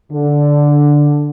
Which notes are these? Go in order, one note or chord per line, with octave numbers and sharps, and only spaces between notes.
D3